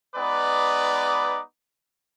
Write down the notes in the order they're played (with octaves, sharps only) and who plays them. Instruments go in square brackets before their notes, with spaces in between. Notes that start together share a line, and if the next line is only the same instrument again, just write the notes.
[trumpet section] G#3 B3 D#4 B4 D5 D6